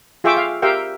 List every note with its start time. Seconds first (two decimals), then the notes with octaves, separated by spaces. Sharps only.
0.24 F4 G#4 E5 G5 C#6 D6
0.37 F5
0.62 G4 A#4 E5 F5 G5